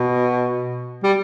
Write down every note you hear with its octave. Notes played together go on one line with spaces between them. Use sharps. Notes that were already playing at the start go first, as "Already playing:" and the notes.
Already playing: B2
G3